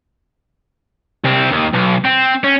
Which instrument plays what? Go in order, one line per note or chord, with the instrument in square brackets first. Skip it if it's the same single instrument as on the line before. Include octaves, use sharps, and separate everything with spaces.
[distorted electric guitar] C2 C4
D#2
B1
C4
C#4